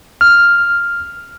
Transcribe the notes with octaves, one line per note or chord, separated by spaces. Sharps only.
F6